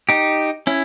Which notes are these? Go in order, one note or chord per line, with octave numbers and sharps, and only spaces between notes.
D#4 G4
C#4 E4